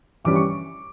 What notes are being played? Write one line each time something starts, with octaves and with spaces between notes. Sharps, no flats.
G2 E3 G3 C#4 D6
C#6